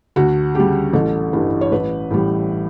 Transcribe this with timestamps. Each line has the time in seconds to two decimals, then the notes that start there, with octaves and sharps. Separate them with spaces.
0.16 D2 F#4
0.55 C#3 G3 G4
0.93 A1 A4
1.33 G2 E3 G3
1.61 C#5
1.72 A1 B4
2.10 A2 E3 G3